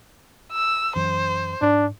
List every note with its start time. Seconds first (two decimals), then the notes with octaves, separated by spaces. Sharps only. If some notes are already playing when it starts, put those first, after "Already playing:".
0.53 E6
0.96 F#2 E3 F#3 C5
1.62 G#2 D4